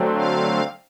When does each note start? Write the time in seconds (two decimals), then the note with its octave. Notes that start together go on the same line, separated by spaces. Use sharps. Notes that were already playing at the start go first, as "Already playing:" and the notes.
Already playing: D3 F#3 A3 C4
0.14 F5